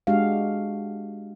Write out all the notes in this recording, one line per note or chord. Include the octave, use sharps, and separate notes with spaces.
G#3 D4 F#4 G4 F5